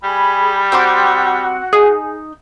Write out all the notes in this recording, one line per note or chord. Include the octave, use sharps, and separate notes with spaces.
G3 G#4 B5
C4 F#4 C6 D6
D#4 G#4